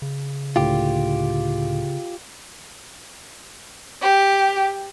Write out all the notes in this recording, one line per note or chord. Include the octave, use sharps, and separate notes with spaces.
C#3
C#2 A2 D3 F4 G4
G4